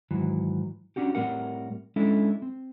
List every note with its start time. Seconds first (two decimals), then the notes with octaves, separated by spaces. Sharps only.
0.11 G#2 D#3 E3 F#3
0.96 C#4 D4 F#4 G4
1.15 A2 G3 C4 A#4 F#5
1.96 G#3 C#4 D4 E4 A4
2.42 C4